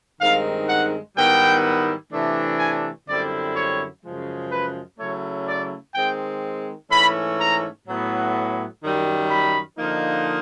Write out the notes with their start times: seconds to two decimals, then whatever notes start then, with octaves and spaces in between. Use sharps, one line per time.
0.21 G2 D#3 G#3 C4 D#4 F5
0.69 F#5
1.16 G#2 D#3 G3 B3 E4 G5
2.12 C3 E3 A3 D4
2.59 G#5
3.08 F#2 D3 G3 C4 E4 D5
3.55 C#5
4.04 F#2 C#3 F3 G#3
4.52 B4
4.99 C#3 F#3 A3 C#4 E4 C#5
5.48 D5
5.95 D#3 G#3 C4 G5
6.91 G#2 E3 A3 C#4 B5
7.39 A#5
7.87 A2 F#3 B3
8.83 F#2 D#3 G3
9.31 B5
9.79 D3 F3 A#3 D#4